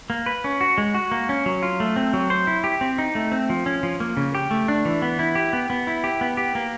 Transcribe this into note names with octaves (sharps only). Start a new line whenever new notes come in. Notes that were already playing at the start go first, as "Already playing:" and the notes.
A#3
B4
C#4
F#4
G#3
F#4
A#3
C#4
F#3
F4
A3
C4
F#3
C5
E4
G4
C4
D#4
A3
C4
F3
C#4
F3
A#3
C#3
G4
A3
D4
E3
B3
E4
G4
B3
B3
E4
G4
B3
G4
A#3